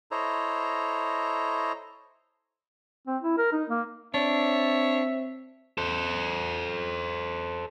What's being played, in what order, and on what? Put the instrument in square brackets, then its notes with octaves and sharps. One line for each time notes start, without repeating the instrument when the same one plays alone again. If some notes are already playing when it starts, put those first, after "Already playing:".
[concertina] E4 A4 C5 C#5 D#5 A#5
[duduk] C4
E4
A#4
D#4
A#3
[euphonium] C4 [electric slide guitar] D4 [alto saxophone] C#5 [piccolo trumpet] E5
[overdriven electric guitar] A4 C5